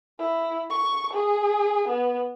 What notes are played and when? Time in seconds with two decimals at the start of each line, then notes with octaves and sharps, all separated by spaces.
0.19 E4
0.70 C#6
1.13 G#4
1.88 B3